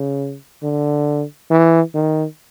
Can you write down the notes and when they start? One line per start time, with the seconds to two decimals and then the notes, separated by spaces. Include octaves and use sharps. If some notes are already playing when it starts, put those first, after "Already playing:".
Already playing: C#3
0.63 D3
1.50 E3
1.94 D#3